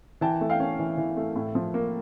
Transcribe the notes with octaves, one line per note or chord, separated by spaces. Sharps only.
E3 G5 A5
A3
F5 G5
C#4
E3
E3
A3
A2
F3
A#3